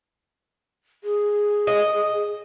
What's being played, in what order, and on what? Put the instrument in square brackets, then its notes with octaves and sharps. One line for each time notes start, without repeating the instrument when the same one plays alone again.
[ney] G#4
[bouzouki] D#5